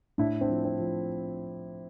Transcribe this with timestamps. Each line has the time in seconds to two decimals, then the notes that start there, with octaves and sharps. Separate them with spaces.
0.18 A2 D4 E4
0.41 C4 D4
0.50 F3
0.65 C4
0.80 F3